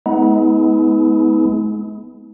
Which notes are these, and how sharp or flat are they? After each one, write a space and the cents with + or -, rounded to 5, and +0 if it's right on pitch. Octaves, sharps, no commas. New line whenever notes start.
G#3 +35 B3 +10 D#4 +45